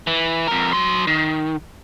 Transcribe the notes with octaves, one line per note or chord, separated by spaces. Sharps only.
E3
F2 A#4
F#3 C6
D#3